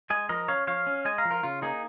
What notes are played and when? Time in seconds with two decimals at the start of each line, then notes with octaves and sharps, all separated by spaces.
0.10 G#3 D#5 G#5
0.29 F3 A#4 D#5
0.48 C#4 C#5 F5
0.67 F3 C#5 F5
0.87 C#4
1.05 G#3 D#5 G#5
1.18 F5 A#5
1.25 F3
1.31 F4 A#4
1.43 C#3 F4
1.62 A#3 D#4 G#4